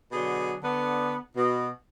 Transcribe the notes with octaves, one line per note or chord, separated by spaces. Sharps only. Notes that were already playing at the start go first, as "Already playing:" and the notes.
B2 D3 F#3 G#4
D3 B3
B2